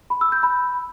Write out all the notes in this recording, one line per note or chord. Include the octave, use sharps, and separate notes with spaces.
B5
E6
G6
B5